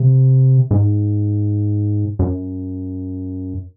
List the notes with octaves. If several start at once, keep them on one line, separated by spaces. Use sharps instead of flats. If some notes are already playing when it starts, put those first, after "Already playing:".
Already playing: C3
G#2
F#2